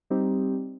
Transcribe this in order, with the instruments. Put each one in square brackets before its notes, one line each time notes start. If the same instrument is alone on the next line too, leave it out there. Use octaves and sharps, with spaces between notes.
[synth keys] G3 C4 D#4 G4